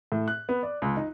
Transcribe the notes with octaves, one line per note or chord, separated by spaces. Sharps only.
A2
F#6
B3
D5
C#2
D#4